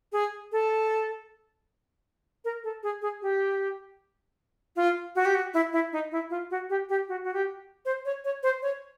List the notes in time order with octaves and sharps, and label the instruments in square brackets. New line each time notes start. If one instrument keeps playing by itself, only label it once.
[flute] G#4
A4
A#4
A4
G#4
G#4
G4
F4
F#4
G4
F#4
E4
E4
D#4
E4
F4
F#4
G4
G4
F#4
F#4
G4
C5
C#5
C#5
C5
C#5